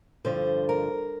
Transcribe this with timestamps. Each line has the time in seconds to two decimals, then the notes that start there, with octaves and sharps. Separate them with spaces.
0.25 G2 D3 F3 C5
0.69 A#4